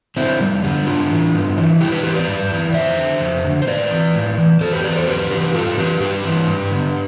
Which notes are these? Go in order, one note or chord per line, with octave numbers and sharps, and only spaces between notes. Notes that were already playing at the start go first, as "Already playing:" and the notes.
D3 C4 E4
F2 G3
D3 G3
G2 D4 F4
E3
G2
E3
G2 E4 G4
G4 B4
E3 G4 B4
B4 D5
G2
E3
F2 C5 E5
D3
F2
D3
C5
A2 B4 D5
E3
A2
E3
E2 A4 C5
G4 B4
C3 E3 B4 D5
A4 C5
E2 G4 B4
C3 E3 G4 B4
G2 F4 A4
E3 G4 B4
G2 G4 B4
E3
G2
D3